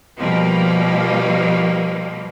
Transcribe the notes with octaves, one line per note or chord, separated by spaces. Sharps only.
B2 F3 G3 A#3